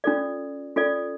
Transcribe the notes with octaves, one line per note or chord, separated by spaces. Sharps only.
C#4 F4 A4 D5
C#4 F4 A4 D5